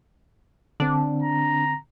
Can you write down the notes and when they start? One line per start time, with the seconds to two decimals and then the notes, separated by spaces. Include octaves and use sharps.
0.80 D3 C4 D4
1.22 A#5